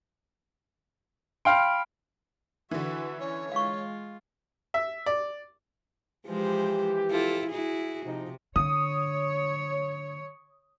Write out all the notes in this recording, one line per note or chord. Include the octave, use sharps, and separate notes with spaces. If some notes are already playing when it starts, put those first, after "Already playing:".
F5 G5 B5 C6 F6 D7
D3 E3 F#4 B4 E5
C#4 C#5
G#3 F4 F5 C#6
E5
D5
E3 F3 G#3 G4 C5
E4 F4 A4
E4 F#4 G#4
C3 F3 D#4
D3 C#5 D#6